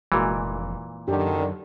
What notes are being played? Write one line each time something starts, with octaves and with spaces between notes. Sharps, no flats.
F1 A#2 E3 G#3 F#4 A#4
F#2 D3 D#3 D4 G4